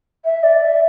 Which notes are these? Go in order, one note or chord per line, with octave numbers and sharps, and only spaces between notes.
E5
D5
E5